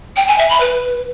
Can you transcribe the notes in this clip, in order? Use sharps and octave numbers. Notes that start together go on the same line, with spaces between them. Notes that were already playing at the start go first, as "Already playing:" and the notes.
G5
G#5
E5
B5
B4